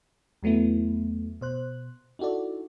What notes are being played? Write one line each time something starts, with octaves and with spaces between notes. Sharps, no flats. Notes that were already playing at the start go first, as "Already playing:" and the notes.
E2 F#3 A3 B3 E4
B2 C5 F#6
D#4 E4 F#4 A4 D5